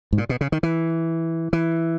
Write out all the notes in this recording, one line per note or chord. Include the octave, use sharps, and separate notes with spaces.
G#2
A#2
B2
C#3
D#3
E3
E3